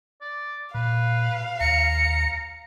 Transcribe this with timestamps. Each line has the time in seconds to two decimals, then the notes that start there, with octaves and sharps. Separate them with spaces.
0.21 D5
0.74 A#2 B4 F5
1.61 D#2 A#5 C#7